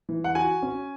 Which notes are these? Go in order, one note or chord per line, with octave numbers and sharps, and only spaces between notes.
E3
F#5
F#4 G#5
C#4